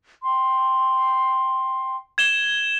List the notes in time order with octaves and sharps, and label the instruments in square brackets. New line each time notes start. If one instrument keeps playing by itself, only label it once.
[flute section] G5 C6
[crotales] G#6 E7 G7